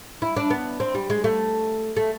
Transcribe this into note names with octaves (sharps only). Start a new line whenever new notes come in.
E4
D4
B3
C4
G3
G#3
A3
A3